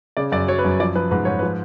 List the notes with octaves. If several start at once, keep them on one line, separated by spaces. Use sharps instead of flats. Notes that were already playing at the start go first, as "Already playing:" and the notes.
C#3 D5
F#2 D5
F#3 C#5
B4
F#2
F3 D5
F3 B4
G#2 B4
G#2 C#5
F3 B4